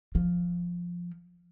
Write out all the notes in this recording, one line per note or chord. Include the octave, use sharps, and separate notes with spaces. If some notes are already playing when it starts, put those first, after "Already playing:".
F3